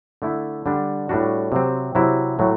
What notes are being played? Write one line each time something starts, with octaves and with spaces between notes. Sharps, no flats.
D3 A3 E4
D3 G3 D4
A2 G3 D4 F#4
C3 F#3 C4
C3 F#3 C4 E4
A2 F#3 A3